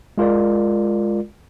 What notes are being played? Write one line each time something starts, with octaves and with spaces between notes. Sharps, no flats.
G#3 F4 A#4 D5